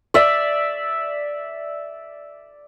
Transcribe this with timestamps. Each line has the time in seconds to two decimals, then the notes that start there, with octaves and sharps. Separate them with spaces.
0.14 D5 E5